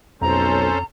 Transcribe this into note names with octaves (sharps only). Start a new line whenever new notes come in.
B1 F2 C#4 A4 C5 A#5